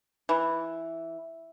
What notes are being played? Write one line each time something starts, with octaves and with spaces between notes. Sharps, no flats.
E3